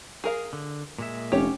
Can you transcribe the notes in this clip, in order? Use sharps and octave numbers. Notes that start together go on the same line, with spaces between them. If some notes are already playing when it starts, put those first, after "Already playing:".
G#4 A#4 F5
D3
A#2 G#3 E5
F1 C#4 G4 C#5